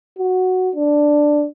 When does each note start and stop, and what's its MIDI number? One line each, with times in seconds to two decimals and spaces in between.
0.19 0.70 66
0.76 1.46 62